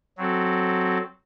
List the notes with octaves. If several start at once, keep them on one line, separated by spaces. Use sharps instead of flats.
F#3 C4 F#4 A4